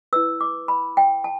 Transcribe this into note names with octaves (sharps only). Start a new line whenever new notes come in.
E4 B4 E6
D6
B5
G5
A5